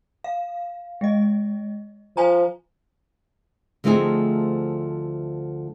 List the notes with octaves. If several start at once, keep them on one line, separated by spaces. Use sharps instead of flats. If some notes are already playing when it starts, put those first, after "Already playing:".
F5
G#3 D#5
F3 C5 G#5 A#5
D2 F3 A3 C4 D#4 G#4